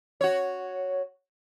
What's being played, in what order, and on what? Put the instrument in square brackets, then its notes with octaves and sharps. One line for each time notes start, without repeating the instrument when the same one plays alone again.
[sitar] F#4 C#5